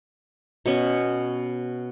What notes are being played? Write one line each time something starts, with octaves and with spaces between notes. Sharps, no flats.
B2 B3 C#4